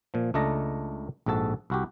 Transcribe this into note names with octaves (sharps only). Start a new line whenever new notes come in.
A#2 F3
C#2 A3 D4 D#5 A5 A#5
A#1 G#2 F#4 A4 A5
C2 F#4 G4